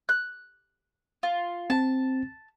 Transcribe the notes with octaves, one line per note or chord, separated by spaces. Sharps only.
F#6
F4
C4 A5